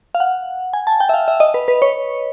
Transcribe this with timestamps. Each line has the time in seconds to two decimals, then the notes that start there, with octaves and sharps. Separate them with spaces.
0.15 F5
0.20 F#5
0.73 G#5
0.87 A5
1.00 G5
1.09 E5
1.14 F5
1.28 E5
1.40 D#5
1.54 B4
1.68 B4
1.82 C#5